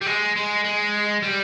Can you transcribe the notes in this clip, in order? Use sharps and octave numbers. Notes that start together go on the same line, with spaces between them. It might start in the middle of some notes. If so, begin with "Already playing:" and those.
G3
G#3
G#3
G#3
G3